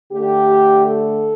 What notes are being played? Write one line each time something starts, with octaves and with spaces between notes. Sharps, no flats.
D3 A3 D4 G4
A4